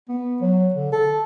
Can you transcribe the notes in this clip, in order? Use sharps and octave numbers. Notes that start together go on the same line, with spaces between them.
B3
F#3
D3
A4